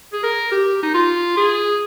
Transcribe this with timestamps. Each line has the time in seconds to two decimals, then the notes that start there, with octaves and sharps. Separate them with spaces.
0.13 G#4
0.23 A#4
0.52 G4
0.83 D#4
0.94 F4
1.37 G#4